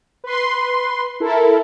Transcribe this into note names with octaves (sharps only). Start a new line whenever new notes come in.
B4 C6
E4 A4 A#4